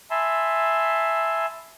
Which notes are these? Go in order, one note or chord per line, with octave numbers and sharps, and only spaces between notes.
E5 G#5 A5 B5 C6